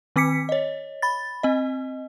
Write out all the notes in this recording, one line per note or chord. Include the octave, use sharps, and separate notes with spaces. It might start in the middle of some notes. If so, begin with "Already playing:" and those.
D#3 C4 D6 B6 C#7
C#5 D#5
B5 A6
C4 D#5